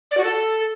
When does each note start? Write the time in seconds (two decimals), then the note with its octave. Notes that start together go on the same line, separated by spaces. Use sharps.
0.11 D5
0.18 F#4
0.24 A4